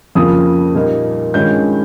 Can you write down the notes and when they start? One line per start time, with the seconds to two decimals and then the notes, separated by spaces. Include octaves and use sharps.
0.15 F2 C#3 F3 A#3 F4 D#6
0.75 A#2 G3 A#3 D#4
1.34 G2 D#3 G#3 C#4 F4 G6